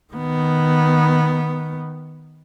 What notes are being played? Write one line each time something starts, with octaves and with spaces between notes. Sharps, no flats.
D#3 B3